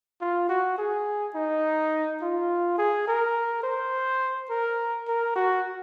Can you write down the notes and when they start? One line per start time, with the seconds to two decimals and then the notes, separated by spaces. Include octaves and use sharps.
0.21 F4
0.49 F#4
0.78 G#4
1.35 D#4
2.22 F4
2.78 G#4
3.08 A#4
3.64 C5
4.50 A#4
5.08 A#4
5.35 F#4